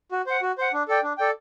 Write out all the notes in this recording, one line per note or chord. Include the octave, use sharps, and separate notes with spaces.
F#4
C5 F#5
F#4
C5 F#5
D4
A4 D5 G5
D4
A4 D5 G5